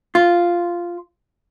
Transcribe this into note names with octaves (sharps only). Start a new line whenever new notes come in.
F4